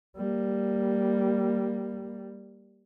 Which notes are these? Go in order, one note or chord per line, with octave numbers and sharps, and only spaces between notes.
G3 A#3